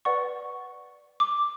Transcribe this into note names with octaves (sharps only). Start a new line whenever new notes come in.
B4 D5 F#5 C#6
D6